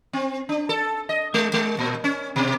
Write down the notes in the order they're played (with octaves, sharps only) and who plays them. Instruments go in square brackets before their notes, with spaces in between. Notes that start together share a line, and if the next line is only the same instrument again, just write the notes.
[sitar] C4
D4
A4
D#5
G#3
G#3
A#2
C#4
B2